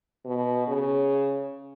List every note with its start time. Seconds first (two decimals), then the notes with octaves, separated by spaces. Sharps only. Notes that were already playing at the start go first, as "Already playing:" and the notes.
0.25 B2
0.68 C#3